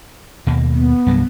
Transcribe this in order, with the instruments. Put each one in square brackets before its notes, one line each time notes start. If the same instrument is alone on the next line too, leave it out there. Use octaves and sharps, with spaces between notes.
[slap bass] D#2 B2 A#3
[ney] B3
[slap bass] C2 G2 F#3